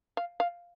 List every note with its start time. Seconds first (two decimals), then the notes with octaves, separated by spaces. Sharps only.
0.17 F5
0.40 F5